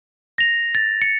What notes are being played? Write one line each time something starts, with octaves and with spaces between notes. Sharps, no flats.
A#6 F7
A6
C#7